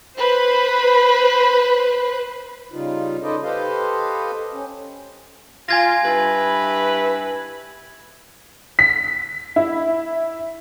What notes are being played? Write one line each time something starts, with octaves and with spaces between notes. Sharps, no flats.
B4 C5 B5
C#3 G3 D#4 F4
D#4 A4 B4 C5 D5 D#5
G4 A4 B4 C5 D#5 F5
C#4
F4 G#5 G#6 A#6
G2 E4 B4
B6
E4